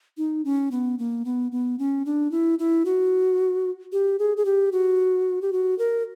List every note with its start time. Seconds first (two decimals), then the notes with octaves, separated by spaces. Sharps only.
0.18 D#4
0.45 C#4
0.71 B3
0.99 A#3
1.25 B3
1.52 B3
1.79 C#4
2.06 D4
2.31 E4
2.59 E4
2.85 F#4
3.92 G4
4.19 G#4
4.37 G#4
4.45 G4
4.72 F#4
5.42 G4
5.53 F#4
5.79 A#4